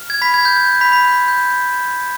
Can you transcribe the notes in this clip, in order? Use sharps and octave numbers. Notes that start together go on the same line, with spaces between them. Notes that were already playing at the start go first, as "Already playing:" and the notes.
Already playing: F6
G#6
B5 B6
G#6
G6
G6
B5 B6
B5 B6
C6 G6
G6